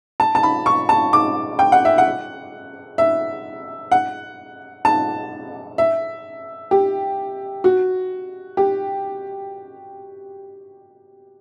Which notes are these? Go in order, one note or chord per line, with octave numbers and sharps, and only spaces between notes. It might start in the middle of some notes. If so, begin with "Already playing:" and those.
A5
A5
B5
C#6
A5
D6
G5
F#5
E5
F#5
E5
F#5
A5
E5
G4
F#4
G4